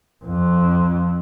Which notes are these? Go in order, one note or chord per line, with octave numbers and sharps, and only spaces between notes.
F2